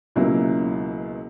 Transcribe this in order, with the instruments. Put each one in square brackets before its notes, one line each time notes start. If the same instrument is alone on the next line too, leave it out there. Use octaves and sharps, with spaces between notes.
[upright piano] C#2 B2 F#3 A#3 E4